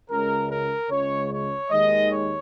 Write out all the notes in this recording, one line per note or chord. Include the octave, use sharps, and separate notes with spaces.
C#2 C#3 G#3 A#4
A#4
C#2 C#3 G#3 C#5
C#5
D#2 D#3 G#3 D#5
C#5